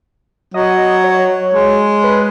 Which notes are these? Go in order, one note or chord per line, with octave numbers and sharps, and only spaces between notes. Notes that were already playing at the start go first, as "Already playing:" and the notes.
F#3 D#5
C#5
G#3
B4